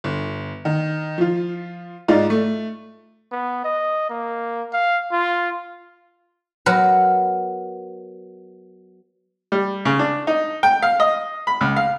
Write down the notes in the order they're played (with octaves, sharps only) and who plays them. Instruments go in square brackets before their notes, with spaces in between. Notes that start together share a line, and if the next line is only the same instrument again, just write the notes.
[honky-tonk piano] G1
D#3
F3 F4
G#2 D#4 F4 D5
A3
[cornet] B3
D#5
A#3
F5
F4
[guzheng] F#3 B3 A#4 B4
[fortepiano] G3
C#3
D4
D#4
G5
F5
D#5
B5
C#2
F5